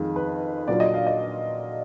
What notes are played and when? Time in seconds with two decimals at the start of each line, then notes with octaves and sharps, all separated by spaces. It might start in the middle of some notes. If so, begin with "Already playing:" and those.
Already playing: F2 D#3 G#3
0.16 B4
0.68 A#2 F#3 D4 F4 D5
0.80 D#5
0.94 F5
1.07 D#5